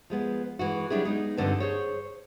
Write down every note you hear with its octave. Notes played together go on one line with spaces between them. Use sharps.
F3 G#3 B3
E3 G#3 F#4
F#3 G3 D4 E4 G#4
G#3 B3 D#4
G2 D3 F3 C4 D#4
G#4 C5 C#5